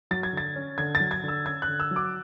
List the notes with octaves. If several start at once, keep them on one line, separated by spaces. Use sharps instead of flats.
F#3 A6
G#6
D3 A6
C#4
D3 G#6
A6
F#3
G#6
D3 E6
C#4 G#6
F#6
D3
E6
F#3
D6